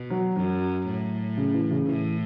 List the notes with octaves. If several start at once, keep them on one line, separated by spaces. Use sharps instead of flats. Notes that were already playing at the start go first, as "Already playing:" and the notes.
Already playing: B2
F#3
F#2 F#3
A2
C#3
E3
C#3
A2 E3